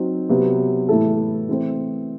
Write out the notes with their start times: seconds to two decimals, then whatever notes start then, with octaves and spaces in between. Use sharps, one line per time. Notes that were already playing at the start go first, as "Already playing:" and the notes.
Already playing: F#3 C4 D#4 F#4
0.29 C3 F#3 B3 F#4
0.89 A2 E3 A3 E4 A4
1.49 E3 A3 C4